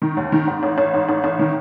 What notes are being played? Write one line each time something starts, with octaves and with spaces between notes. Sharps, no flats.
D#3
D#2
D#3
G#2
A1
A1
G#2
A1
A1
D#3